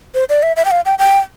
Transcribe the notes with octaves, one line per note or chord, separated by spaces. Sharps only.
C5
D5
E5
E5
G5
F5
G5
G5